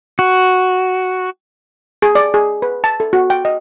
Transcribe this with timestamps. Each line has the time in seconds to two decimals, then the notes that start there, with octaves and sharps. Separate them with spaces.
0.19 F#4
2.02 G#4
2.15 D5
2.34 G#4
2.62 B4
2.84 A5
3.00 A4
3.13 F#4
3.30 G5
3.45 D#5